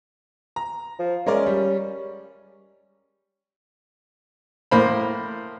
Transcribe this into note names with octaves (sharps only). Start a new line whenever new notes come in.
A#5
F3
G#3 C#4 A#4 D5
G3
A2 A#3 C5 B5